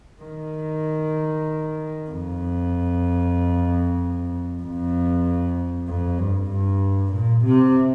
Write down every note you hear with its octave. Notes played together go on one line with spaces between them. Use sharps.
D#3
F2
F2
F2
G2
G2
A#2
C3